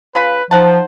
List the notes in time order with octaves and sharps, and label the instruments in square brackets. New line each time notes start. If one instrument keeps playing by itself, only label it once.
[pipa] C#3 F4 B5 [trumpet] B4
[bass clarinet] F3 [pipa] D#4 F#5 A5 [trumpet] C5